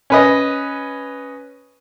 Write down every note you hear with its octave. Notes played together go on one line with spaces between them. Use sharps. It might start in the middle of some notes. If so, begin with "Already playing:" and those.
C#4 B4 D#5